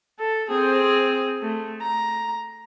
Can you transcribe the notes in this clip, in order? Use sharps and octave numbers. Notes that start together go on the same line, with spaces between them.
A4
C4 G#4
A3
A#5